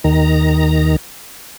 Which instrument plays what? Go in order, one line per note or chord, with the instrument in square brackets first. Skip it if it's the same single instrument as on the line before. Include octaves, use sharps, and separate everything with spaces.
[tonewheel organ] D#2 D#3 A#5